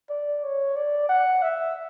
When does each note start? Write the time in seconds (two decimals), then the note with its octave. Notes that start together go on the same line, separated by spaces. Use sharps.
0.09 D5
0.43 C#5
0.76 D5
1.09 F#5
1.42 E5